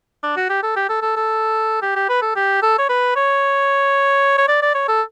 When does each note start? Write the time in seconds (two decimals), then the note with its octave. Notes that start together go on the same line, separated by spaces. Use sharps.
0.23 D4
0.37 F#4
0.49 G4
0.63 A4
0.76 G4
0.89 A4
1.02 A4
1.17 A4
1.82 G4
1.96 G4
2.09 B4
2.22 A4
2.36 G4
2.62 A4
2.79 C#5
2.89 B4
3.16 C#5
4.38 C#5
4.48 D5
4.62 D5
4.75 C#5
4.88 A4